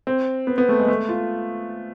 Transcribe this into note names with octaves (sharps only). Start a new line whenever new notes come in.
C4
B3
B3
A3
G#3
A3
F4